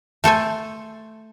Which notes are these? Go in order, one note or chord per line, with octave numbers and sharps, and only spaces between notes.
A3 A4 C5 G#5